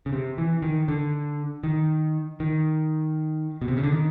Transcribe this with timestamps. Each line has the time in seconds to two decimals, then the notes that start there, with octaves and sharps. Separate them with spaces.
0.06 C#3
0.13 C3
0.38 E3
0.62 D#3
0.88 D3
1.64 D#3
2.40 D#3
3.62 B2
3.68 C3
3.77 C#3
3.83 D3
3.92 D#3